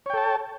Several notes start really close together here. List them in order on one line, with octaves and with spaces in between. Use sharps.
C#5 G5 A4 A5